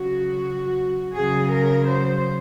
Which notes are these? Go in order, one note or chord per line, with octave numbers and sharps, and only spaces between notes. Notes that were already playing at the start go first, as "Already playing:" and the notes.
Already playing: C#3 F#3 F#4
C#3 F#3 G#4
A#4
C5